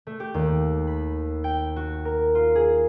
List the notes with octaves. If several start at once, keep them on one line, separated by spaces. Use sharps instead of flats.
A3
G4
D#2
B5
G5
F#4
A#4
F4
G#4